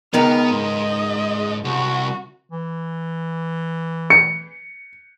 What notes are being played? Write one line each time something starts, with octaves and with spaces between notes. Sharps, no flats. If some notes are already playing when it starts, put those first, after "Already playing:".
C#2 D#3 B3 A#4 F6
G#2 D#5
C2 F#4
E3
C#7